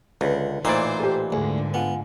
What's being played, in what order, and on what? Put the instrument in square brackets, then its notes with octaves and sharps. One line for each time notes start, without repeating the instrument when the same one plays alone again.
[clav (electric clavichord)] C#2 [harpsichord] D3 [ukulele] B4
[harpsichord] A1 D#4 F5 [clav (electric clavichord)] A#2 E3 D5 [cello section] C5
[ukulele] G4 A4
[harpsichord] D2 [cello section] G#2 D3 G#3 [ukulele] G#4
[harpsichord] B3 [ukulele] F4 F#5 G#5